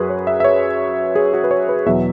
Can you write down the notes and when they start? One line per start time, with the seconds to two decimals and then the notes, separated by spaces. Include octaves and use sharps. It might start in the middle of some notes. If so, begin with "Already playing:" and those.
Already playing: F#2 F#3 F#4 G#4 B4
0.10 C#5
0.27 E5
0.40 E5
0.44 C#5
1.15 G#4
1.34 F#4
1.44 B4
1.51 C#5
1.69 B4
1.86 E2 B2 F#3 E5